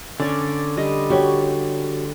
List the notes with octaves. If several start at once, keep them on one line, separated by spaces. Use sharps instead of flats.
D3 C#4 D5 C#6
G3 D#5
F#4 G4 C#5